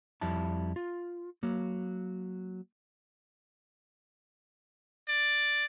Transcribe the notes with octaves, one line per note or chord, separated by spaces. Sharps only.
F2 G3 E4 A5
F4
F#3 A#3
D5